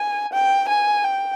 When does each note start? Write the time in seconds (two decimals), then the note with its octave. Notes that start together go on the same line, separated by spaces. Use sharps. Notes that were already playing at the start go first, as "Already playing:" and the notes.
Already playing: G#5
0.33 G5
0.69 G#5
1.04 G5